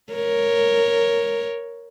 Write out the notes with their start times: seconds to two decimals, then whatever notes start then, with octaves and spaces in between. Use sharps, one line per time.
0.12 A#4 C#5